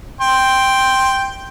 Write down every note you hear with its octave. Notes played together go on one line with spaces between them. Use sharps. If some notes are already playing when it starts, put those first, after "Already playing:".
G5 C6